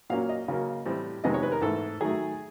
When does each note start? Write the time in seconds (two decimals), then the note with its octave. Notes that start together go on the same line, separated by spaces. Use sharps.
0.10 A#2 F#3 A#3 C#4 F5
0.29 D#5
0.48 C#3 F#3 A#3
0.85 A2 E3 G3 C4
1.24 F2 C3 D#3 G#3 B3 D#5
1.34 C#5
1.43 B4
1.52 A#4
1.61 G#2 E3 A3 A4
2.01 D#3 F#3 A3 G#4